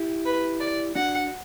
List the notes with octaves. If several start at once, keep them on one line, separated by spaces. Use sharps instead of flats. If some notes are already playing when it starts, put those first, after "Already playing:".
Already playing: E4 G4
B4
D5
D4 F#4 F#5